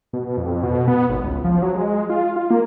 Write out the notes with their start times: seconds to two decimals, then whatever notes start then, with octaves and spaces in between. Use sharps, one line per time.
0.13 B2
0.37 F2
0.63 B2
0.88 B3
1.09 G#1
1.24 C#2
1.44 F3
1.62 F#3
1.75 G#3
2.10 F4
2.36 F4
2.50 A#3